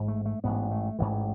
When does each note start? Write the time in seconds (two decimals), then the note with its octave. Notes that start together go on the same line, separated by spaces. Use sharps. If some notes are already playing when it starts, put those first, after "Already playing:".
Already playing: A1 G#2
0.08 A3
0.25 A3
0.44 A1 G#2 B3
0.71 A3
0.99 A1 G#2 E3